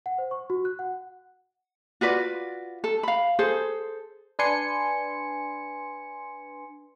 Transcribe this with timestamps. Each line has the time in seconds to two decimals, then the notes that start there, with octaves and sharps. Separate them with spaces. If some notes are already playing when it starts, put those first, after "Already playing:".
0.06 F#5
0.18 C5
0.31 C#6
0.50 F#4
0.65 F#6
0.79 F#5
2.01 F4 F#4 B4 D5
2.84 A4
3.03 F5 B5
3.39 G#4 A4 C5
4.39 D4 B4 G#5 C6 C#7